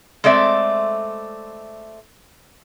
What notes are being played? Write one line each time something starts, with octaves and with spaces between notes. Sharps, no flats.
G#3 A3 C4 D5 E5